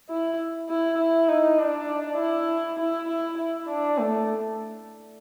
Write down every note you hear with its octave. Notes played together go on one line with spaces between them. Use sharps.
E4
E4
E4
D#4
D4
E4
E4
E4
E4
D4
A3